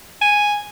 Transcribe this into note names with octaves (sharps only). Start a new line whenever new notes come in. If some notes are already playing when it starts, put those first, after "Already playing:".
G#5